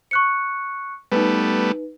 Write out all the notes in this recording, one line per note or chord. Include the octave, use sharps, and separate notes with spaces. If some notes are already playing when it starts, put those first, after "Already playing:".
C#6 F#6 C#7
G3 A3 B3 D#4 B4